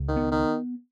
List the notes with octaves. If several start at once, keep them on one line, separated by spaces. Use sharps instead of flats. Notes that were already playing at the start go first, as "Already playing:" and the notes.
Already playing: C#2
D#3
B3
D#3